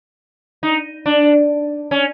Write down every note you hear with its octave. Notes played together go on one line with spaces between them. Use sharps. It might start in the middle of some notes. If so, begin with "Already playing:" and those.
D#4
D4
C#4